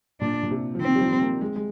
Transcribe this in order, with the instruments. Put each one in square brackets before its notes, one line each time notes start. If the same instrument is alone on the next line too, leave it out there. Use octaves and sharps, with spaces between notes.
[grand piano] A#2 [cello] D4
[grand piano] A#2
C3
F3
[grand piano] D#3 [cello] C4
[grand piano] G3
F3
A#3
G#3
G#3